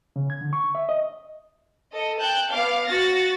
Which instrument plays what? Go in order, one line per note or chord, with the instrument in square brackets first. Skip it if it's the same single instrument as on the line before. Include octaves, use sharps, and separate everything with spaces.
[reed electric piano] C#3
G#6
D3
C#6
E5
D#5
[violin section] A4 D#5
G5 A5 F#6 G6
B3 F5 D6
F#4 A6 A#6